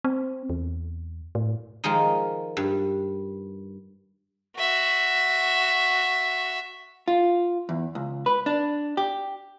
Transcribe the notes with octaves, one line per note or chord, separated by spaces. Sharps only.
C4
E2
A2
D#3 F3 G#3 D#4
G2
F#4 E5
F4
E2
C#2
B4
D4
G4